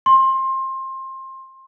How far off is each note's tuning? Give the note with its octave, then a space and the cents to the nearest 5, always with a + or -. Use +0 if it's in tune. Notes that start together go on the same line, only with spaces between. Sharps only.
C6 +25